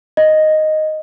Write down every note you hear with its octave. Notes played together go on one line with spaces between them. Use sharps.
D#5